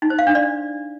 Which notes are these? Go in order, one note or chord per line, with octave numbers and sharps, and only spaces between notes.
D#4
C5
F5
D4
D5